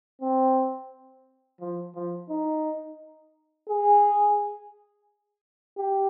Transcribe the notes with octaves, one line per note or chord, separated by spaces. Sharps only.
C4
F3
F3
D#4
G#4
G4